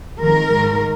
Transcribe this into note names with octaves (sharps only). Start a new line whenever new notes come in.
F2 D#3 G#3 A#4
G#2 D#3 G#3